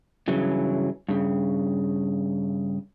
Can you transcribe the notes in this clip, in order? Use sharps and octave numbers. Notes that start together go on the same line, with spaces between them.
G2 C#3 E3 F#3
G2 C#3